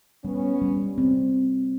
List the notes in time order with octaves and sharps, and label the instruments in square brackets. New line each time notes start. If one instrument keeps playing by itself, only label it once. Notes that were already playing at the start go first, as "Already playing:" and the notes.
[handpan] G3 [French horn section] B3 C#4
[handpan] G3
C4